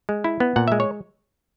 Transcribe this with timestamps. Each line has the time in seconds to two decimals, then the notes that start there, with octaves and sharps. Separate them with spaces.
0.09 G#3
0.24 E4
0.40 B3
0.56 A#2 F#5
0.68 G#3 E5
0.80 C#5